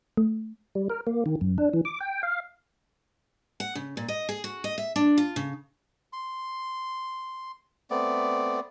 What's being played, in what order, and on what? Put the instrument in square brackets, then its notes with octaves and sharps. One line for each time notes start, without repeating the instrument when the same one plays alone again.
[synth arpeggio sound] A3
[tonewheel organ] G3
A#4
A#3
D#3
F#2
D4
E3
D6
G5
F5
[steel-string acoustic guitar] F#5
C#3
A#2
D#5
G#4
F#4
D#5
E5
D4
F4
C#3
[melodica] C6
A3 B3 C4 D5